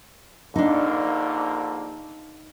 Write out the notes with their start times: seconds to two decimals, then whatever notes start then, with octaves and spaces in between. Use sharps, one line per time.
0.56 A#1 D3 A#3 D4 D#4